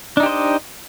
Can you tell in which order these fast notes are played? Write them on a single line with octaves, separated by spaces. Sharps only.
D4 D#4 G4 C5 D#5